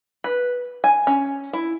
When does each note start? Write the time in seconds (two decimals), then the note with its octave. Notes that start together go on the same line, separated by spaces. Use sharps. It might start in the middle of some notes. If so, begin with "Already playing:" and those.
0.24 B4
0.84 G#5
1.07 C#4
1.53 E4